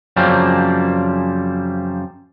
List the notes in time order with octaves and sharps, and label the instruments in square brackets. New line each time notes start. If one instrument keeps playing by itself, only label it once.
[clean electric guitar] F#2 C#3 F3 G3 A#3 C4